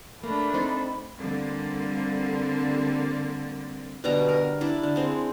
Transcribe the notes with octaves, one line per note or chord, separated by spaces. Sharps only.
A3 A#3 D4 B5
C4 D#4 C5
D3 G3 A#3 C4
B2 D3 G3 A#5
A#4
D4 E4
D3
G#3 C4